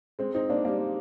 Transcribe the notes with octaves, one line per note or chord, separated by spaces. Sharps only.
G#3 C4
C4 D#4
A#3 D4
G3 A#3